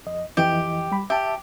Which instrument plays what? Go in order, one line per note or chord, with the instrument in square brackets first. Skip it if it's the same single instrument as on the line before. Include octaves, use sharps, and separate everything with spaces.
[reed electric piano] F2 D#5
[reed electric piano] F2 E3 D#5 [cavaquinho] G4
[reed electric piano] G3 B5
[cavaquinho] G4 [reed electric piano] E5 A5